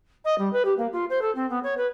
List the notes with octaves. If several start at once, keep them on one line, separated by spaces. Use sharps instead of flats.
D#5
G3
B4
G4
A#3
F4
C5
A4
C4
B3
C#5
B4